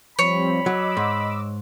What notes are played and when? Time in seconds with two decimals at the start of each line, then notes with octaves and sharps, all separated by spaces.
0.19 F3 G3 C4 C#5 B5
0.66 F#3 D#5 D6 E6
0.97 G#2